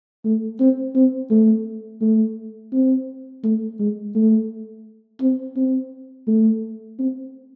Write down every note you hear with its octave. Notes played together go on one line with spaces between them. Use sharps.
A3
C4
C4
A3
A3
C4
A3
G#3
A3
C4
C4
A3
C4